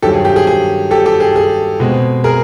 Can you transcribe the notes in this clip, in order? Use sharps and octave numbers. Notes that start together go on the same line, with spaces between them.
G2 D#3 F#3 G4 A4
G#4
G4
G#4
G#4
G4 A4
G4 A4
G#4
G#4
B2 G#3 C4
G#4 A#4